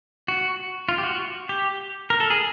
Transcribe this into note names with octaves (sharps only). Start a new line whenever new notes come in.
F#4
F4
G4
F#4
G4
A#4
A4
G#4